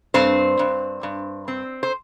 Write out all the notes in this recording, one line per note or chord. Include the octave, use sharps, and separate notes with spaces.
G2 C4 C5
G2
G2
C4
C5